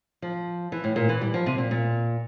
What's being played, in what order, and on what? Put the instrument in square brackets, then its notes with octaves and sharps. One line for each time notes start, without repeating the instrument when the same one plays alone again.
[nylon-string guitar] F3
E3
A2
A#2
E3
G3
F3
C3
A#2
A#2